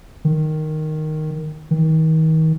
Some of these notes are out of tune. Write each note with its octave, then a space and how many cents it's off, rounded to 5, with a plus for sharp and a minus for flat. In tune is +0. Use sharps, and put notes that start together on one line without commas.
D#3 -5
D#3 +35